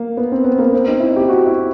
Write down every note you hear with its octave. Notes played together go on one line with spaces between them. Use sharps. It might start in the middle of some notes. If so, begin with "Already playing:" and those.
Already playing: A#3
B3
C4
B3
A#3
C4
D#4
E4
G4
F#4
E4